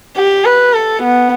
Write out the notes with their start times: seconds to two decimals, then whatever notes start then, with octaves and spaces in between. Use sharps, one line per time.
0.16 G4
0.45 B4
0.74 A4
1.03 B3